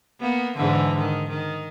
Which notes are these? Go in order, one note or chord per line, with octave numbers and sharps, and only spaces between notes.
A#3 B3
G#2 D3 E3
D#3
D#3